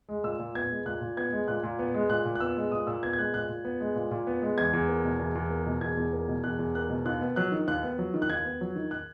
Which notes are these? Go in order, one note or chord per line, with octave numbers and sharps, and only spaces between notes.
G#3
A#2 E6
A#2
B3 G#6
G#3
A#2 F#6
A#2
B3 G#6
G#3
A#2 F#6
A#2
B3
G#3
A#2 F#6
A#2
F#6
B3 E6
G#3
A#2 D#6
A#2 E6
B3 G#6
G#6
G#3 F#6
A#2 F#6
A#2
B3
G#3
A#2
A#2
B3
G#3
E2 G#6
E2
A#3
B2
E2
E2
A#3
B2
E2 G#6
E2
A#3
B2
E2 F#6
E2
A#3 F#6
B2
D#2 F#6
B3
F#3 F#6
D#3
D#2 F#6
B3
F#3
D#3
F#6
D#2 G#6
B3
F#3
D#3
F#6